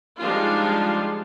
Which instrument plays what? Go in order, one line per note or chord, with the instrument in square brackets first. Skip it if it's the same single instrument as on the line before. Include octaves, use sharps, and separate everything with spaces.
[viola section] F3 G3 G#3 D4 D#4 F4